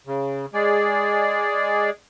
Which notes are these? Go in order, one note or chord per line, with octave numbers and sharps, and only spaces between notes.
C#3
G#3 G#4 D5